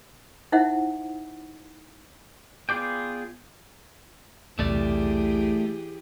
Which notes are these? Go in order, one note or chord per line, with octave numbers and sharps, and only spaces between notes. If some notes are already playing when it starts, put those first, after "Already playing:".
D#4 E4 C5 E5 F#5
B3 F4 G#4 D5 G5
B1 E2 C3 E3 A3 G4 G#4 D5